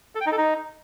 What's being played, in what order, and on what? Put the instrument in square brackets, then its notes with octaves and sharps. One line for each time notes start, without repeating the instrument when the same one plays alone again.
[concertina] A4
G5
D#4
A4
D#4